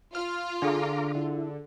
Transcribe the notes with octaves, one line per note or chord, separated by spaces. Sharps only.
F4 F6
D3 D4 G#4 A4 F5 A#5 D6
D3 E4